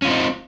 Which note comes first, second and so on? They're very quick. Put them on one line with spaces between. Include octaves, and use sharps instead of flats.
C#4 F4 C4 D#4